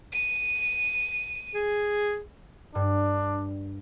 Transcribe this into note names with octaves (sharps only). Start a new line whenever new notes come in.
D#7
G#4
G2 D4